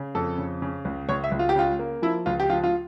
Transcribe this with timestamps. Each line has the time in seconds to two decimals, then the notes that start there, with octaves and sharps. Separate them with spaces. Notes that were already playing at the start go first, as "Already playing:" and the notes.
Already playing: C#3
0.15 F2 A4
0.38 C#3
0.62 C#3
0.85 C#2
1.09 C#2 C#5
1.24 E5
1.32 C#2
1.39 F4
1.49 G4
1.56 C#3 F4
1.79 A#3
2.02 F3 E4
2.26 C#2 F4
2.40 G4
2.50 F3 F4
2.64 F4